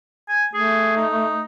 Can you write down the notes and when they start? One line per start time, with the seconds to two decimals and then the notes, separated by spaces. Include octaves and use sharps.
0.29 G#5
0.54 A3 G#4
0.97 D#4